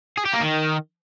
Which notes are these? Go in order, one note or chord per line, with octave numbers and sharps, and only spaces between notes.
G#4
G4
A#3
D#3